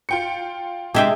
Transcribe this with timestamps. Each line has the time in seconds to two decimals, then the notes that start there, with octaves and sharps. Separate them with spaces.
0.09 F4 G5 C#7
0.94 C3 G#3 G4 G#4 E5 G5